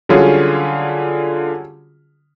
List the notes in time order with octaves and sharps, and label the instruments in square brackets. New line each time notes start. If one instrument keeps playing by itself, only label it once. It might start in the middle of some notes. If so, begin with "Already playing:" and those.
[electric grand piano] D3 F4 G#4 [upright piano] F#3 G3 C#4